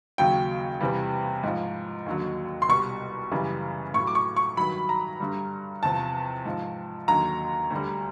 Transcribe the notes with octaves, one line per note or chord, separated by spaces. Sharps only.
D#2 C#3 F#3 G5
E2 C3 E3 G3
G#2 F3
D#2 D3 F#3
C6
C2 B2 G3 C#6
F#2 C#3 E3 G3
A2 F#3 C#6
D6
C#6
C#6
G2 D#3 F#3 B5
A#5
G2 D3 G3
E2 C3 F3 A5
G#2 F3
D#2 D3 F#3 A#5
D2 D3 G3